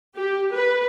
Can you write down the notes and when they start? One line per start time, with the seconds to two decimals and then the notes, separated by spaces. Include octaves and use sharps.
0.16 G4
0.53 B4